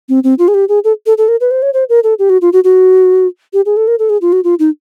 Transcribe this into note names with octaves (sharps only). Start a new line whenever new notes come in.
C4
C4
F4
G#4
G4
G#4
A4
A4
A4
A#4
B4
C5
C#5
C5
A#4
A4
G4
F#4
F4
F#4
F#4
G4
G#4
A4
A#4
A4
G#4
F4
F#4
F4
D#4